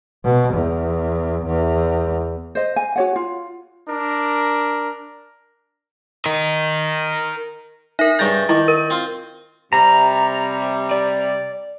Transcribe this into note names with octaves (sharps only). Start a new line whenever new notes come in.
B2
E2
E2
C5 D#5
G#5
F#4 C#5 F#5
F4
D4 A#4
A#4 D#5
D#4 A#4 E5
G2 C#3 A#5 G6 A6 A#6
D#3 E4 D6
A#4
C4 F4
C3 G3 A#5
D5